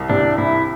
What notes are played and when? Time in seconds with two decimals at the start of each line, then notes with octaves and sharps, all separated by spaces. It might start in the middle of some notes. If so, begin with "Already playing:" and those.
Already playing: C2
0.10 C3 D4
0.38 C2 E4